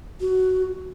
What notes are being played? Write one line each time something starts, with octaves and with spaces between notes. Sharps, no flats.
F#4